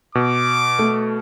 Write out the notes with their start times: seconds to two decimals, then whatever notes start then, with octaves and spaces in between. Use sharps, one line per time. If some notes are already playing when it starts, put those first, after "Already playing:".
0.15 B2 D6
0.79 A3